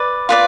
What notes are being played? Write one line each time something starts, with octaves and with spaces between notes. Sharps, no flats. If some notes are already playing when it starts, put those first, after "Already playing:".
Already playing: B4 D5
F4 B4 D5